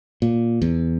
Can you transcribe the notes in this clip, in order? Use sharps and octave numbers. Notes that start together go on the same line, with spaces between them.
A#2
E2